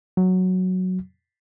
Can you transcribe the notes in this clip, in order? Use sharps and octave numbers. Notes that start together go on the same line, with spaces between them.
F#3